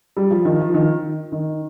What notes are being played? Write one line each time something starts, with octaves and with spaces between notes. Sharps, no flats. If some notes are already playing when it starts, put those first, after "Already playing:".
G3
F3
D#3
F3
D#3
D#3